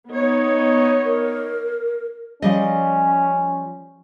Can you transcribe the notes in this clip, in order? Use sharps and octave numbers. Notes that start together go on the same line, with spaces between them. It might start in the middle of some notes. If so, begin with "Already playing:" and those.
B3 D#4 C#5
A#4
F3 G3 C#4 D#5